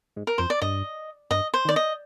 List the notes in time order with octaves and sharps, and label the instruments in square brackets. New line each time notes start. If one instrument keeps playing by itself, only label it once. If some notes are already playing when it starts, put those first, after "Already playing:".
[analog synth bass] G#2
[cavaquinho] A#4
[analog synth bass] F2 [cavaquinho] C5
[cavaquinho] D5
[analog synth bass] G2 [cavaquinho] D#5
[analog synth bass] G2 [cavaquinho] D#5
[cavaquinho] C5
[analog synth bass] D#3 [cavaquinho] D5
[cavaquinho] D#5